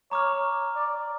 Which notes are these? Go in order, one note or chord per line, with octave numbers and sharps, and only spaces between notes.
C#5 A#5 D6 F6
D5